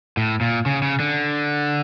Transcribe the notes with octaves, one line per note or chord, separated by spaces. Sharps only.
A2
A#2
C#3
C#3
D3